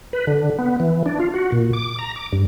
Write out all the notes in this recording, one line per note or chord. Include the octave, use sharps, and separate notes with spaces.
B4
D3
B3
E3
D4
F4
F#4
A#2
D6
A#5
D6
G2